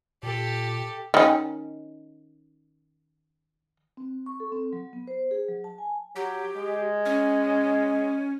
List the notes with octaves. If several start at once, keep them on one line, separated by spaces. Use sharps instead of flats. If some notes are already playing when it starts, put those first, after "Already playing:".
A#2 G4 A4
D#3 C#4
C4
C#6
A4
C4
F#3
B3
C5
G#4
F#3
A5
G#5
F#3 G4
G#3
C#4